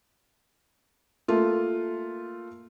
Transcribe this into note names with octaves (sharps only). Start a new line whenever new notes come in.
A3 A#3 F4